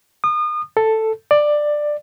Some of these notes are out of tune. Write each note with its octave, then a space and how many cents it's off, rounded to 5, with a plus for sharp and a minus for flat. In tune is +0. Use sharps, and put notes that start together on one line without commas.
D#6 -35
A4 +5
D5 +10